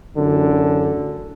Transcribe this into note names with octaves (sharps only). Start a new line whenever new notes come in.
A1 F#2 D3